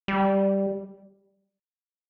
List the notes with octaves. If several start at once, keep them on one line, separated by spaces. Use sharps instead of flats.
G3